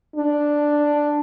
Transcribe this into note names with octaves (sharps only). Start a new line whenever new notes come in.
D4